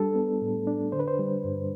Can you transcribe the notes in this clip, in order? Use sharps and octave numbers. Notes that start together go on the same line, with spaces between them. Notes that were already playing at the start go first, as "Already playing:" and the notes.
Already playing: G3 D4 A4
B3
A2
D4
D3 C5
B4
C5
G3
G2